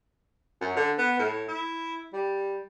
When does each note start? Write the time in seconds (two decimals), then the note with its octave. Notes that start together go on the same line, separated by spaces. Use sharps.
0.61 F#2
0.76 D3
0.98 B3
1.19 A2
1.48 E4
2.13 G3